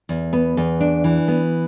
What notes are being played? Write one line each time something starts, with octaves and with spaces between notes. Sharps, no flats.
E2
B3
E2
D4
E3
B3